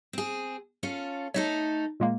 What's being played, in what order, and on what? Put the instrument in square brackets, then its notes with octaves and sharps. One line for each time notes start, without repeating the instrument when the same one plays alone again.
[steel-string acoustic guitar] C4 G#4
C#4 F4 A4
[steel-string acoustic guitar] A3 D#4 A4 [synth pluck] C#5
[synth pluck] A#2 G#3 A#3